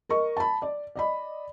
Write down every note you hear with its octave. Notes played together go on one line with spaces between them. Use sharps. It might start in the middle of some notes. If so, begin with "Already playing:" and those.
A#4 D#5 C#6
A5 B5
D5
D5 D#5 B5